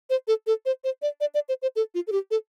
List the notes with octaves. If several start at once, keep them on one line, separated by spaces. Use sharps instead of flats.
C5
A4
A4
C5
C5
D5
D5
D5
C5
C5
A4
F4
A4
G4
A4